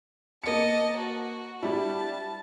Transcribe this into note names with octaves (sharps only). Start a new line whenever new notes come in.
A#3 D#5 A5 C#7
F#4
G3 D4 E4 A5